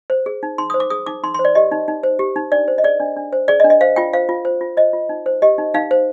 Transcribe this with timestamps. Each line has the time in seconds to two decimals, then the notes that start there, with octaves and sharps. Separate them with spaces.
0.10 C5
0.26 G#4
0.43 D#4
0.58 D#4 C6
0.70 D#6
0.74 C5
0.80 D6
0.90 G#4 D#6
1.06 D#4 D6
1.23 D#4 C6
1.34 C6
1.39 C5
1.45 D5
1.55 G4 D#5
1.72 D#4
1.88 D#4
2.03 C5
2.19 G4
2.36 D#4
2.52 D4 D5
2.68 C5
2.78 D#5
2.84 G#4 D5
3.00 D4
3.17 D4
3.33 C5
3.48 G#4 D5
3.60 D#5
3.64 D4
3.70 D#5
3.81 C5 F5
3.96 F4 G5
4.13 C5 F5
4.29 F4
4.45 C5
4.61 F4
4.77 C5 D#5
4.93 F4
5.09 D#4
5.26 C5
5.42 G4 D#5
5.58 D#4
5.74 D#4 F5
5.91 C5